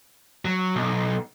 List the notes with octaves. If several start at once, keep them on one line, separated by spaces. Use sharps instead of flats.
F#3
B1